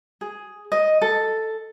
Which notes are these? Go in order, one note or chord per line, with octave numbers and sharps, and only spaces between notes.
G#4
D#5
A4